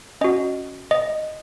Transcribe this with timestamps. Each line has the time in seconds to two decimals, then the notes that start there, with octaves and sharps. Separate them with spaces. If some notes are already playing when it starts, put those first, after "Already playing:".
0.21 C#4 F#4 D#5
0.91 D#5